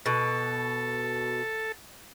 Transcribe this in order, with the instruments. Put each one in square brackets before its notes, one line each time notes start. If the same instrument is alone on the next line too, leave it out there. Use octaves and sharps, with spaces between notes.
[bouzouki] B2 [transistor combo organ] A4